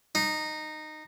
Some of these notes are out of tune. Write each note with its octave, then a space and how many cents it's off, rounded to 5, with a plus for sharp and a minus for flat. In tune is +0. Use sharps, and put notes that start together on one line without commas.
D#4 -15